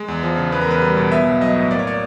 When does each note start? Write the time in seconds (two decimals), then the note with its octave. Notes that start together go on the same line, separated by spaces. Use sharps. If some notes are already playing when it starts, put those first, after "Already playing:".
Already playing: G#3
0.08 E2
0.23 F3
0.37 C#3
0.52 E2 B4
0.62 A#4
0.67 E2 B4
0.82 G3
0.97 B2
1.12 B3 E5
1.26 B1
1.41 F#3 D#5
1.56 A2
1.71 A#3 D5
1.79 C#5
1.87 D5